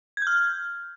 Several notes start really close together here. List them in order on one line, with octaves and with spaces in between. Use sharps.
G#6 G6 F6